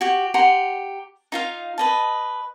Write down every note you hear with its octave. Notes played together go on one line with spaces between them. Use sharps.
F#4 G4
G4 F#5 A#5 C6
D#4 F4 F5
B4 D#5 A5